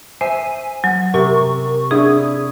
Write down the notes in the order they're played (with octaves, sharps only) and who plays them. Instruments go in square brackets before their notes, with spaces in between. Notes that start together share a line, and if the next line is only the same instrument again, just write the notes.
[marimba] C5 [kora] E5 [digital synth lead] G#5
[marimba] F#3
[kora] C3 [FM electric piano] A#4 [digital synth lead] C#6
[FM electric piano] D4 D#6 [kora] E4 [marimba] G#4